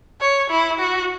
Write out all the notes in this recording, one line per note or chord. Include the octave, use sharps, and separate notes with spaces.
C#5
E4
F#4